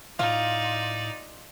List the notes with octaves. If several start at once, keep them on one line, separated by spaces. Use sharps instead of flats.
A2 D#4 F4 D5